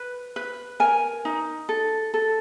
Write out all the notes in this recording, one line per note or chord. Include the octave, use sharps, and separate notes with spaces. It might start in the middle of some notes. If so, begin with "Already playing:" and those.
Already playing: B4
B4
A#4 G#5
D#4
A4
A4